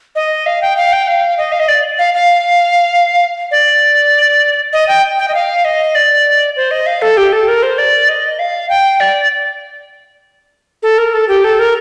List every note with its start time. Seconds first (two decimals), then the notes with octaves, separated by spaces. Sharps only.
0.15 D#5
0.46 F5
0.62 G5
0.77 F5
0.93 G5
1.08 F5
1.38 D#5
1.52 F5
1.60 D#5
1.68 D5
1.99 F5
2.14 F5
3.51 D5
4.73 D#5
4.88 G5
5.19 G5
5.28 D#5
5.34 F5
5.65 D#5
5.95 D5
6.56 C5
6.71 D#5
6.86 F5
7.02 A4
7.17 G4
7.33 A4
7.48 A#4
7.63 C5
7.78 D5
8.09 D#5
8.39 F5
8.70 G5
9.00 D5
10.83 A4
10.98 A#4
11.14 A4
11.28 G4
11.44 A4
11.59 A#4